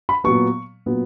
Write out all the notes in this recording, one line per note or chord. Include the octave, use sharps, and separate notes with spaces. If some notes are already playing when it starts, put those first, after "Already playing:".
B5
A#2 F#3 B3 C#6
A#2 F#3 B3